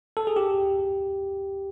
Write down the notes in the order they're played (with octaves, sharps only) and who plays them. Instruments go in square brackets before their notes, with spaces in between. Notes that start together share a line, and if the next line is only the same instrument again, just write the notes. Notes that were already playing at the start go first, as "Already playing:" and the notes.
[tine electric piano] A4
G#4
G4